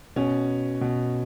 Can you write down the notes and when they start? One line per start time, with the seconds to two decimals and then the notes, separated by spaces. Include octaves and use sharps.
0.16 B2 C#4
0.81 B2